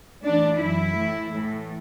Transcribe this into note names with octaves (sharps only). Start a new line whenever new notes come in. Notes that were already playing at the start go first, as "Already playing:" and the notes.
A2 E3 D4
F#2 E3 E4
A2 E3
A2 E3